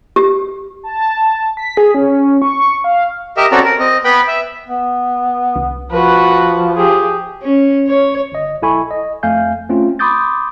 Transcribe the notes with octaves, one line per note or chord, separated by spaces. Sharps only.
G4
A5
B6
G#4
C#4
C#6
F5
G4 A#4 D#5 E5
C4 C#4 F#4 A4 D5 A#5
A#4
C4 D#5
B3 B4 G5 B5
E5
B3
C2
F3 F#4 B4
G4 G#4
C#4
C#5
G1 D#5
B1 E4 A4 G#5 B5 C#6
D#5
F2 A3 F5 G#5 G6
A3 C4 C#4 F4
B5 C6 D6 D#6 G6 A6